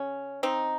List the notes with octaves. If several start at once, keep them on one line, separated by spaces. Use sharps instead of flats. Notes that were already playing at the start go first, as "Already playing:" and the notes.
Already playing: C#3 C#4
C4 D#4